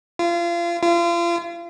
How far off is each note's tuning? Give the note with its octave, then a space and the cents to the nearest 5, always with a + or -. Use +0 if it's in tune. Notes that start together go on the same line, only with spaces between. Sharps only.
F4 -30
F4 -35